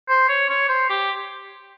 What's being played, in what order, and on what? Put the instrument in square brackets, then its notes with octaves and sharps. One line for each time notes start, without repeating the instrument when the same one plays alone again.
[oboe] C5
C#5
C#5
C5
G4